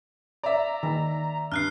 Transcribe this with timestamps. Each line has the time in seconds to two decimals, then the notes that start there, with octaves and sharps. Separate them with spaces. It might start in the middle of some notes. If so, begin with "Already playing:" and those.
0.43 D5 E5 A#5
0.83 D#3
1.52 G2 F6 F#6 C7